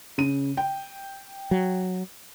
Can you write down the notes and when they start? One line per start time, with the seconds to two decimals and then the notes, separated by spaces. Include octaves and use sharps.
0.18 C#3 D#7
0.57 G5
1.51 F#3